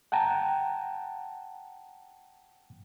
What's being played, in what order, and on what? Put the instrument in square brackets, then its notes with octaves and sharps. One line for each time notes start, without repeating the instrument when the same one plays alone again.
[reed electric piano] F#5 G5 A5 A#5